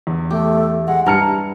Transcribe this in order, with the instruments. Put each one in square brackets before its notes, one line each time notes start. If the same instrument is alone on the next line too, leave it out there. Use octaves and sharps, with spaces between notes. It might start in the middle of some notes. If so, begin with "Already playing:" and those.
[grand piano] E2
[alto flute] A3 [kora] G4
[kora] G#3 [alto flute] F#5
[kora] G2 E4 [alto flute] A5 [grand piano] A#5 F6 C#7